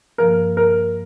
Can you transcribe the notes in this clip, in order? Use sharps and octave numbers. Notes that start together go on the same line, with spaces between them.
G2 F3 A#3 A#4
A#4